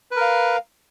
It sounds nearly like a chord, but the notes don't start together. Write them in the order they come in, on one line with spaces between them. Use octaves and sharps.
B4 A#4 F5